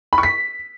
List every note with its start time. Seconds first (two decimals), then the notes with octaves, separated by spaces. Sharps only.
0.13 B5
0.18 C#6
0.23 B6